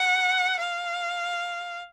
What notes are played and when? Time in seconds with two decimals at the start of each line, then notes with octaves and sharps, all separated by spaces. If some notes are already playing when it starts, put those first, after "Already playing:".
Already playing: F#5
0.59 F5